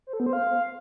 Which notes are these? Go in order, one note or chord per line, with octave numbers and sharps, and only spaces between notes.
C5
A4
B3
C5
F5